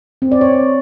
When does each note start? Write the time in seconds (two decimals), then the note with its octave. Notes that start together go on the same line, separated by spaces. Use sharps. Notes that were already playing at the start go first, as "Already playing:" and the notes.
0.22 C4
0.32 D5
0.41 C#5